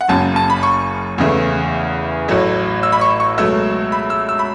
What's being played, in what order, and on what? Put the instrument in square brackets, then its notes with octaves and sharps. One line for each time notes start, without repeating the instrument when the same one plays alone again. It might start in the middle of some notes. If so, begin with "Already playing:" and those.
[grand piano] F#5
F#1 F#2 C#3 A5
A5
B5
C#6
E2 C#3 E3 A3
A1 A2 F#3 A3
E6
B5
C#6
C#6
C#2 B2 F#3 A3 E6
B5
E6
E6
B5